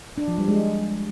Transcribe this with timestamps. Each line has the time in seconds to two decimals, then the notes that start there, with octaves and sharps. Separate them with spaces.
0.18 D4
0.28 F3
0.38 G3
0.48 G#3